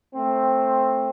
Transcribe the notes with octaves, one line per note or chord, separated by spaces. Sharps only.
A3 C4